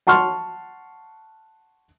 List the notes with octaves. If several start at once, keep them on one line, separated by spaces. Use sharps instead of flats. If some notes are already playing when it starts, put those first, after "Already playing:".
F#5 A5 C6 C#6 F6